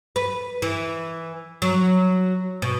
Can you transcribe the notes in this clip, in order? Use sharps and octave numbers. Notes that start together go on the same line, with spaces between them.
B4
E3
F#3
B2